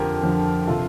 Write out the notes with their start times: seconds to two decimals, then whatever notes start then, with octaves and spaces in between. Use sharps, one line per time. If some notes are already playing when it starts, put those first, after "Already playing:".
Already playing: F2 D3 F3 G4 A#4
0.23 F2 D3 F3
0.67 C3 F3 F4 A4